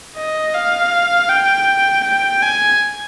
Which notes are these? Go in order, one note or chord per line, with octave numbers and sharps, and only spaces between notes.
D#5
F5
G5
G5
G#5